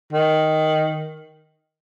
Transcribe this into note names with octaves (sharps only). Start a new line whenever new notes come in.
D#3